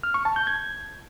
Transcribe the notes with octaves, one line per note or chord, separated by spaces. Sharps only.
F6
C#6
A5
G6
G#6